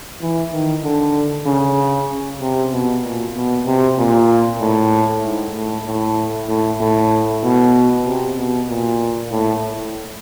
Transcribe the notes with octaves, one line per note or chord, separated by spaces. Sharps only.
E3
D#3
D3
C#3
C3
B2
A#2
B2
C3
A#2
A2
G#2
A2
A2
A2
A2
B2
C3
B2
A#2
A2